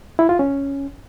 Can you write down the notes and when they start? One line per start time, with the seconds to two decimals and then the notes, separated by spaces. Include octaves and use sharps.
0.19 E4
0.29 F4
0.39 C#4